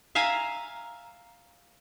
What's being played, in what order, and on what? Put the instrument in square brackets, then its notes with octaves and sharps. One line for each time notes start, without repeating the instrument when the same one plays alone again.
[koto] E5 F5 G#5 A#5